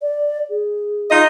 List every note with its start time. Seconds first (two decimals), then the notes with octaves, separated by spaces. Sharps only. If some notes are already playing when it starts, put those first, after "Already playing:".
0.02 D5
0.50 G#4
1.10 D#4 F4 D#5